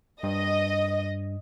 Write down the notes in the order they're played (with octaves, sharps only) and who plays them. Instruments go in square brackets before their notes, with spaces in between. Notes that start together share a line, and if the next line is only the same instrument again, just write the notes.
[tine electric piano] G2 [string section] D#5